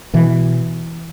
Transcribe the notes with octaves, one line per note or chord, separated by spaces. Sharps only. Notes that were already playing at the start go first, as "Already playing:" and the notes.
B2 E3